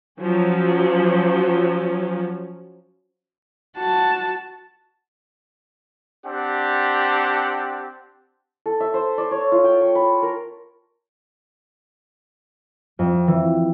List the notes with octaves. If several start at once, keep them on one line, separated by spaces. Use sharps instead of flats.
F3 F#3 C#4
F#4 A5
C4 D4 G4 F#5 A5
A4
E5
C5
D5
C#5
F4
G5
C#6
B5
A#4
F2
E3